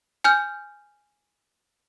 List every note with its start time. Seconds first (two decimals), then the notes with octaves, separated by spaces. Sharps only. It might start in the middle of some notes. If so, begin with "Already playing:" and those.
0.24 G#5 F6 G6